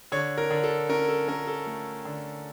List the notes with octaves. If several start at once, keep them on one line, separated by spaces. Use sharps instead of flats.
D3 C#5
A#4
D3
A4
C#4 A#4
A4
C#4 A#4
A4
A3
D3